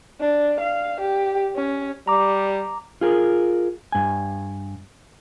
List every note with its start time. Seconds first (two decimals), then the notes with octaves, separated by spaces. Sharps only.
0.20 D4
0.60 F5
1.01 G4
1.55 C#4
2.07 G3 A#5 D6
3.01 F4 G#4 A#4
3.92 G2 G#5